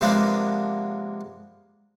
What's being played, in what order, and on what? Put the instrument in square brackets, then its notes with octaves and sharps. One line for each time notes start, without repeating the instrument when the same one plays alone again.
[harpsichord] C3 F3 G#3 A#3 B3 D4